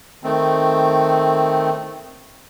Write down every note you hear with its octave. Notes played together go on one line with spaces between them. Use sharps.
D#3 A3 C4